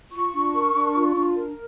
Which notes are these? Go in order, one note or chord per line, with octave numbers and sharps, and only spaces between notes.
F4 C#6
D4
A#4
D4
F4
D4
A#4